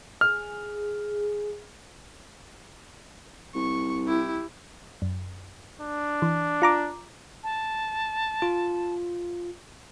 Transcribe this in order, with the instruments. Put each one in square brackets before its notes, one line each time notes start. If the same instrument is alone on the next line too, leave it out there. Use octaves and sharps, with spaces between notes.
[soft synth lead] G#4 [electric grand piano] F6
[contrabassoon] C2 [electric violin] C#6
[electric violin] E4 G4
[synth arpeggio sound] F#2
[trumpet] D4
[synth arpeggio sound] E3
F4 A#5 D6
[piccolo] A5
[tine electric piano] F4